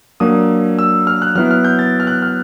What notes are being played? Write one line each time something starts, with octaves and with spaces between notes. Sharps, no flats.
F#3 A#3 D4 D#6
E6
F6
F#6
F#3 B3 E4 F6
F6
G6
A6
F6
F#6
F6